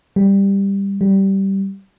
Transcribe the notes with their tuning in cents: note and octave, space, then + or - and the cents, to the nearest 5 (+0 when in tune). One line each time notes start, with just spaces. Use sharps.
G3 +10
G3 -15